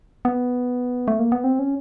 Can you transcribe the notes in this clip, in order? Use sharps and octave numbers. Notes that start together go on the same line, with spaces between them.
B3
A3
A#3
B3
C4
C#4